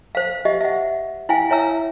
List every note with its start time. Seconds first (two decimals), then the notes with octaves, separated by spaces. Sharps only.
0.15 C5 F5
0.45 G4 D#5 E5
0.61 E5 F#5
1.29 E4 F5 G5 G#5
1.50 E4 C#5 E5 A#5 E6